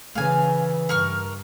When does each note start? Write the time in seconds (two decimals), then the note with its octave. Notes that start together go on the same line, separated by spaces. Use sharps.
0.15 C#3 E3 F5 G#5
0.89 G2 A#4 C#6 F6